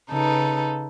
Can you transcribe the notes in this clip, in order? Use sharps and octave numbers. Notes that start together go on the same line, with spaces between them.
C#3 D#4 A4 B4